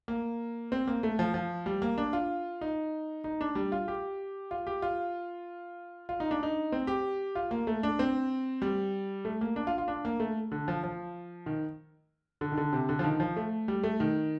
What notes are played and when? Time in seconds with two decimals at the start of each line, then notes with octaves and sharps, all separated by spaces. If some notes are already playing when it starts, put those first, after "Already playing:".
0.08 A#3
0.72 C4
0.87 A#3
1.03 A3
1.19 F3
1.34 F3
1.66 G3
1.82 A#3
1.98 D4
2.13 F4
2.61 D#4
3.24 D#4
3.41 D4
3.55 G3
3.72 F4
3.88 G4
4.51 F4
4.67 G4
4.82 F4
6.09 F4
6.20 D#4
6.31 D4
6.43 D#4
6.72 C4
6.87 G4
7.35 F4
7.51 A#3
7.67 A3
7.83 D4
7.99 C4
8.62 G3
9.25 A3
9.41 A#3
9.56 D4
9.67 F4
9.78 F4
9.88 D4
10.05 A#3
10.20 A3
10.52 D3
10.68 F3
10.84 F3
11.46 D#3
12.41 D3
12.52 D#3
12.57 D3
12.73 C3
12.89 D3
12.99 F3
13.04 D#3
13.20 F3
13.36 A3
13.68 G3
13.84 A3
14.00 D#3